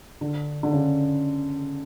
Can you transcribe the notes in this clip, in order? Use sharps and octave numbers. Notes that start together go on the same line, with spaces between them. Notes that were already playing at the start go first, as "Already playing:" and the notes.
D3
D3
C#3